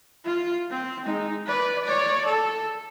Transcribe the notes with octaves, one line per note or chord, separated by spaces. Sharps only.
F4
C4
G#3 D#4
B4 D5
C#5 D5
A4